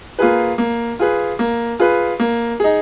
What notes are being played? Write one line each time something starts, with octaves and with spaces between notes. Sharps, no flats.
A#3 F4 G#4 B4
A#3
F4 G#4 B4
A#3
F4 G#4 B4
A#3
D#4 G#4